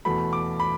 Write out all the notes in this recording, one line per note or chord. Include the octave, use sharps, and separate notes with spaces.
E2 B2 A3 B5
D6
B5